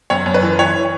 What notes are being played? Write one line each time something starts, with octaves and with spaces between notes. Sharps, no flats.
F#2 C#5
F#2
B4
E3
E3 C#5